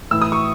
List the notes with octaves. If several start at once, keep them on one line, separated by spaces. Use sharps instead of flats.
A2 E3 E6
D#6
C#6